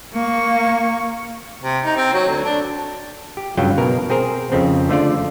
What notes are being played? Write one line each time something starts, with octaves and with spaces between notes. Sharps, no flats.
A#3 C#6
C3
D#4
C4
F#3
D2
D4
G4
G2 C#3 F#3 F4 G5
B2 A#4
C4 G#4 A#4 C5
F2 C#3 C4
D3 A3 F4 D5